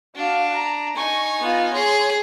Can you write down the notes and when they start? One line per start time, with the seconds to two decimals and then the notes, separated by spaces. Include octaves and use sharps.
0.16 D4 F#4 F5
0.55 A#5
0.96 D#4 G#5 C#6
1.40 B3 F4
1.73 G#4 C#5 C6